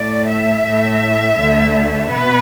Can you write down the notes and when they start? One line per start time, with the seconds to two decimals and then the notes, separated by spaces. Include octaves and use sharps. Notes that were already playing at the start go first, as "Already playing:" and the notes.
Already playing: A2 A3 D5
0.26 E5
0.63 A2 A3
1.36 D2 D3 A3
2.09 B2 B3 B4